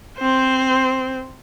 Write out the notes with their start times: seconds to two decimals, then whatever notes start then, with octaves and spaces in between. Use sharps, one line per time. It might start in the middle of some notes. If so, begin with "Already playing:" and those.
0.17 C4 C5